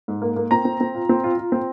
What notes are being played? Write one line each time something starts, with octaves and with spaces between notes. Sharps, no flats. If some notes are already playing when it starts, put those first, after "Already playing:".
G#2
A#3
A#3
C4 A#5
C4
C4
F4
C4
F4
F4
C4